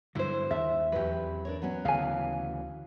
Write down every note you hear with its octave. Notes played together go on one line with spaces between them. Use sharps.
G2 D3 F#3 E4 C5
D#2 E5
E2 F#3 G4 B4
D4 A#4 C#5
F#3 B3 C#4
D2 C#3 E3 F5 G#5